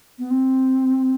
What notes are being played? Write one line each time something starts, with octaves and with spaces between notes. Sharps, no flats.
B3
C4